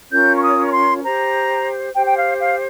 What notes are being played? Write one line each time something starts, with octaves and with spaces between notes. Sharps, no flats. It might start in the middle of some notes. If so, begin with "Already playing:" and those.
C#4 F4 A#4 C#5 G6
C#6
D#6
C#6
C6
G4 C5 A#5
G4 C5 G5
G5
F5
F5